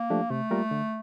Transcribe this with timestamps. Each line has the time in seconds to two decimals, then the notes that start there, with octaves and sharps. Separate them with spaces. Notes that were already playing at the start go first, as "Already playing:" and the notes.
Already playing: A#3
0.10 F3 A3 D4 G4
0.30 C3 A3
0.51 G3 A#3 F4 A#4
0.71 D3